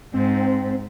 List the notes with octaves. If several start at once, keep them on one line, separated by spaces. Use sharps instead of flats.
G#2 C4